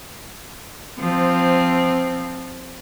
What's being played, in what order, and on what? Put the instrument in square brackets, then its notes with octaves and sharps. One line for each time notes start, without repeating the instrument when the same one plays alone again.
[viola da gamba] F3 C4